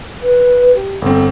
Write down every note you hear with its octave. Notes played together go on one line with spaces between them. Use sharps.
B4
G4
G1 C4 A4